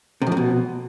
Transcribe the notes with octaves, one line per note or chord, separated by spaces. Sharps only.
C3
F2
C3
B2